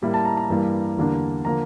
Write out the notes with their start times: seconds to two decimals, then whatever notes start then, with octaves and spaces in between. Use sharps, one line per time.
0.02 A2 G3 A#3 E4
0.14 A5
0.25 A#5
0.37 A#5
0.50 G2 E3 G3 A#3
0.97 E2 D3 G3 A#3 D4
1.45 D3 F3 A#3 A#5